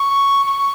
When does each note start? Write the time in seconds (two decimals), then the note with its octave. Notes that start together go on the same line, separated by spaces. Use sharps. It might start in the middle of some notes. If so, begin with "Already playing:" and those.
Already playing: C#6
0.47 C#6